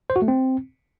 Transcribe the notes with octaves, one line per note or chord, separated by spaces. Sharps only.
C5
F#4
A3
C4